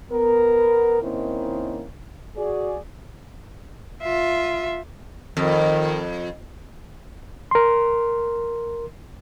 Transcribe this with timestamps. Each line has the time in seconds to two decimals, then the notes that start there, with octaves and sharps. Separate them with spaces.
0.11 B3 A#4
1.01 D#3 A#3 C4 C#4 D#4 E4
2.36 F#4 G#4 D5
4.02 F4 E5
5.37 F2 D#3
7.51 A#4 C6